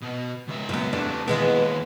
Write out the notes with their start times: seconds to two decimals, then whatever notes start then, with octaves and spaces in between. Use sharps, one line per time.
0.02 B2
0.48 C#2 E5
0.69 F#2 B3
0.93 E2 C3 A3 D4
1.28 D#2 E3 G#3 B3 E4